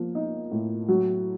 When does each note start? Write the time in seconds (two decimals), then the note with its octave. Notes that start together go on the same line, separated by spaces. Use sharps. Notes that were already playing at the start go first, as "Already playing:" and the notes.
Already playing: F3 A#3
0.15 D#4
0.51 A2
0.88 F#3